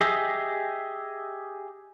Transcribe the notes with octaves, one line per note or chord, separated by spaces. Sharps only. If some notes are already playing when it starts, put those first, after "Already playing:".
G4 G#4 D#5 E5